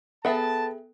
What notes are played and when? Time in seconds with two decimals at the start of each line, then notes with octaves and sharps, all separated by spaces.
0.25 B3 G#4 A4 E5 F#5 G5 A5